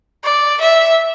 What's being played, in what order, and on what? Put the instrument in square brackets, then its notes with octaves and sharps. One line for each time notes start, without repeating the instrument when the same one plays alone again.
[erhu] D5
E5